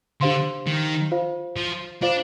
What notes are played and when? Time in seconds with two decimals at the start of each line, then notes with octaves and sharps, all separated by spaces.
0.21 D3 D4 G4 C5 F5 C6
0.67 D#3
1.12 F4 C5 F5
1.56 F3
2.02 D4 F4 C5 F5